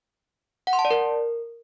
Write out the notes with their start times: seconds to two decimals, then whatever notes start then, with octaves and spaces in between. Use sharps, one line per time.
0.67 F#5
0.73 C6
0.79 A5
0.85 D5
0.91 A#4